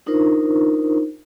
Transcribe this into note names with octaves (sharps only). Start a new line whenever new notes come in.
D4 D#4 F4 A#4 C5